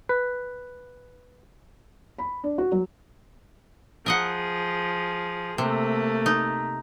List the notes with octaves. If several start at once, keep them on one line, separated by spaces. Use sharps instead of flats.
B4
B5
D4
F#4
F#3
F3 G#4 A#4 D#5 F#5
C3 A3 A#3
D#4